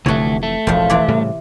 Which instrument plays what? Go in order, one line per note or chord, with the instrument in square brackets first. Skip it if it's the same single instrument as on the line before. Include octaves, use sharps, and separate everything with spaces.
[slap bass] F1 C3 E3 [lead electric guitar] D2 A3 [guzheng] F#4 C#5
[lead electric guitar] A3
[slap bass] E1 A1 [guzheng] F2 F3
[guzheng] C3 E3 D5
[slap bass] A2 C#3 G3